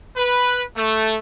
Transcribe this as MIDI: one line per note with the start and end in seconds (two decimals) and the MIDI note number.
0.17 0.62 71
0.76 1.16 57